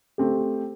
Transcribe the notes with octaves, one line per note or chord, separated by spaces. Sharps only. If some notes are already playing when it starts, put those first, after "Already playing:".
A3 C4 G4